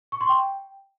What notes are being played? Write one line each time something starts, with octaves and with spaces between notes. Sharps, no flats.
C#6
C6
G5